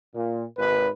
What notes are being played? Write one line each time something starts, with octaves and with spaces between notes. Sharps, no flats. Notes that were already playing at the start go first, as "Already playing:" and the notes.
A#2
G#1 B4